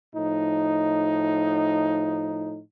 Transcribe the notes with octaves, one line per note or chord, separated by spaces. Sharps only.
A2 F3 D#4